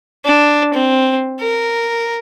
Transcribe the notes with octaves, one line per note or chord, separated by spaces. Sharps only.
D4
C4
A#4